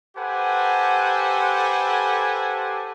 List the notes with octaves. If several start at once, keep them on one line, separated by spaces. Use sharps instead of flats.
G4 A4 B4 C5 F#5 G#5